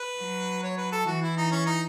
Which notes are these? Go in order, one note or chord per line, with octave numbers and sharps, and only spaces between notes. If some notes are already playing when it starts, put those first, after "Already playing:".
Already playing: B4
F#3
C#5
B4
A4
E3 F#4
E4
D#4
C#4
D#4